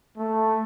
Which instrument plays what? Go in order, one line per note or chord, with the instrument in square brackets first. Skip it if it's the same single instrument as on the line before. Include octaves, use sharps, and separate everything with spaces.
[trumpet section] A3